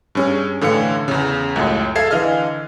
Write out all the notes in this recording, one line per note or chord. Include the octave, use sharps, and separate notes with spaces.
G2 C#4 G#4
A2 D3 E3 F5 C#7
E2 C#3
C#2 F#2 A2
G#4 A4 E5 F5 G#6 C7
D3 E3 D#5 F5 F6